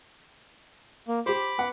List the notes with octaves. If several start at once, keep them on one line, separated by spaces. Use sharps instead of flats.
A#3
G4 C5 B5 D6
B3 F#5